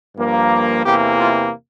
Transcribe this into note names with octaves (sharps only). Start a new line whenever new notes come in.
G2 F3 A#3
E2 C3 E3 A#3 G4
F4